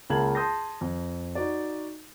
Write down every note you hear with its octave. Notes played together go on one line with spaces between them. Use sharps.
C#2 A#3 A5 G#6 F#7
A5 C6 D#6 G6 A#6
F2
D#4 F#4 D5